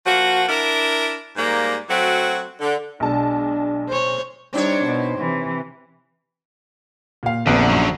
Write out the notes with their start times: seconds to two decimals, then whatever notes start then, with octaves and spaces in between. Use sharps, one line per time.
0.06 F3 A#3 F#4
0.49 D4 E4 A#4
1.36 G#2 G3 A#3
1.89 F#3 A3 C4 F#4
2.61 D3
3.00 B1 G#3 D4 A5
3.88 C5 C#5
4.53 G3 C4 D4 D#4 C#5
4.85 B2
5.19 C3 E3
7.23 A#2 F5
7.47 A#1 F2 D3 B3 B4
7.69 F#2 D3 F#3 C#6